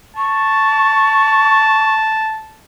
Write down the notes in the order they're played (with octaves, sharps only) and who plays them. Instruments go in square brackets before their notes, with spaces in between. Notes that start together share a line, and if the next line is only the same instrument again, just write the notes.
[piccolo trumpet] A5 [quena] C#6